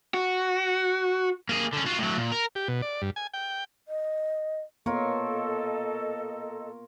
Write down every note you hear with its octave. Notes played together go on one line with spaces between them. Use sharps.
F#4
A#3 G#4
D3 C#4
F4 F#4
A2 F#3
A#2
A#4
G4
B2
D5
G2
G#5
G5
D#5
A#3 B3 F4 A4 A#4 C#5 D#5